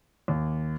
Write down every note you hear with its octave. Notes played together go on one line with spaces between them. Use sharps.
D#2